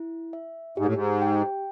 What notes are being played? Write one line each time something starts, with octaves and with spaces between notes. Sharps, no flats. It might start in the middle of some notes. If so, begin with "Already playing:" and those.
Already playing: E4
E5
G#2 G4
A2
G#2
G5